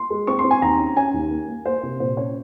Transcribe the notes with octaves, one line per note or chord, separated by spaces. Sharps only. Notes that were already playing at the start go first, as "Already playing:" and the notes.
Already playing: C6
G#3
C4 C#6
C6
C4
G#5
D#2 A#5
C#4
C#4 G#5
D#2
A#3
A#3
A#3 C5
C3
A#2 C5
C#4 C#5